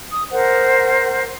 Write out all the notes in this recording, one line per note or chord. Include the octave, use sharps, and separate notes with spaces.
D#6
A#4 C5 F#5